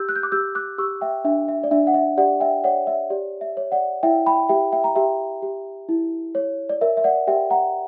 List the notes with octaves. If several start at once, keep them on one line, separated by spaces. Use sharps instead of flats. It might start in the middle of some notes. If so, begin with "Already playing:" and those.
Already playing: G4 E6 G6
F#6
G6
D6 F#6
G4 E6 G6
D6 F#6
G4 C#6 E6
E5 G5
D4 E5
E5
D5
D4 E5
F#5
E5
G4 D5 F#5
E5 G5
C#5 D5 F#5
E5
G4 D5
E5
C#5
D5 F#5
E4 E5 G5
G5 B5
G4 E5 G5
E5 G5
A#5
G4 E5 G5
G4
E4
C#5
D5
A#4 E5
E5
D5 F#5
G4 E5 G5
F#5 A#5